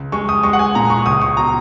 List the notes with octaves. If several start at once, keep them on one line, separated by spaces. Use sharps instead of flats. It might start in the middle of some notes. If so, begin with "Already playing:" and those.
Already playing: C#2
G#3 C#6
D#6
G#3 C#6
F#5
G#5
A#2 A#5
C#6
C#2 D#6
C#6
B2 A#5